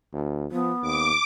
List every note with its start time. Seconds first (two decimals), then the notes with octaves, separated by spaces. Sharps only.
0.13 D2
0.51 F3 B3
0.82 D#2 D6